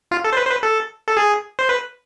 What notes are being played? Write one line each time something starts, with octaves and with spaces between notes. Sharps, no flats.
F4
A4
C5
B4
C5
B4
A4
A4
G#4
C5
B4